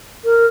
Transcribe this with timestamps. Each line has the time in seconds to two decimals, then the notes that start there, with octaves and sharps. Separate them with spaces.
0.25 A#4